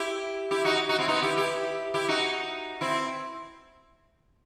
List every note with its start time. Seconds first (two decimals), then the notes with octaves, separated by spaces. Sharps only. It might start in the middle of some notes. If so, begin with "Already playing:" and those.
Already playing: E4 G4
0.51 E4 G4
0.65 D#4 F#4
0.89 D#4 F#4
0.98 C4 E4
1.08 B3 D#4
1.22 E4 G4
1.36 E4 G4
1.94 E4 G4
2.08 D#4 F#4
2.81 C4 E4